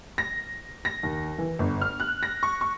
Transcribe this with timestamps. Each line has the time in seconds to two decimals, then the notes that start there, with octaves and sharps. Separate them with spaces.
0.18 A#6
0.85 A#6
1.03 D#2
1.38 E3
1.59 G1
1.81 F6
2.00 F#6
2.23 A#6
2.43 C#6
2.61 C#6